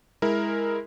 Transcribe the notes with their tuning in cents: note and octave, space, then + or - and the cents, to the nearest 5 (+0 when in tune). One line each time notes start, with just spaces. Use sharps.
G#3 +0 E4 -10 A#4 +0